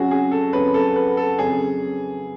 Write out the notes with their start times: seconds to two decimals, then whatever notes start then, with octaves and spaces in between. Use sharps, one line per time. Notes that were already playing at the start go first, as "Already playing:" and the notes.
Already playing: F2 C#3 F#3 C#4 F#4 G#4
0.11 G#4
0.31 A4
0.53 F2 C#3 F#3 C#4 B4
0.74 A4
0.96 B4
1.17 A4
1.38 F2 C#3 F#3 C#4 G#4